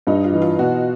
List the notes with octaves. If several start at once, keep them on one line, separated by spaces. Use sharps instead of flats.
G2 D#4
F4
E3
F4
B2 F#4